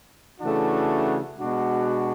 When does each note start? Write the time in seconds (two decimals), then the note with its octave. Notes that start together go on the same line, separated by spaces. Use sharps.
0.40 C#3 E3 A3 D4 F#4
1.38 B2 G#3 D4 F#4